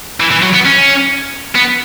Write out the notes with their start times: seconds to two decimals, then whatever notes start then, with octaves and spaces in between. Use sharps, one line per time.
0.20 E3
0.31 E3
0.42 F#3
0.53 B3
0.65 C#4
1.55 B3